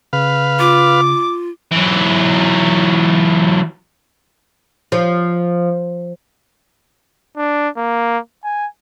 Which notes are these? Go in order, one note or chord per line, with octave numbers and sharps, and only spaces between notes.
C#3 B4 F5
F4 D6
E3 F#3
F3
D4
A#3
G#5